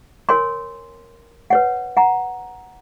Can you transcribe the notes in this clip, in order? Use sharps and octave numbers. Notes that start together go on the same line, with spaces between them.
A#4 C#5 G#5 C6
B4 C#5 F#5
F#5 A#5